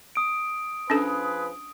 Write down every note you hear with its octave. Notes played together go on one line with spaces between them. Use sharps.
D#6 D7
F3 C#4 D4 G#4 A4 B4